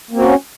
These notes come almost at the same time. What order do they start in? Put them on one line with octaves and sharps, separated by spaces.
A#3 C4 F#4 C#4